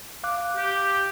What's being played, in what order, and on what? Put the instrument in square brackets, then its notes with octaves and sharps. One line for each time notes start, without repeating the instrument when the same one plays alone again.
[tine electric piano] F5 D6 F#6
[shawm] G4